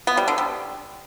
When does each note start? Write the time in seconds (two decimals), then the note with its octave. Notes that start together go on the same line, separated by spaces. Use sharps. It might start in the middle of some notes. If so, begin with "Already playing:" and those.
0.07 B3
0.17 G3
0.28 D3
0.38 G3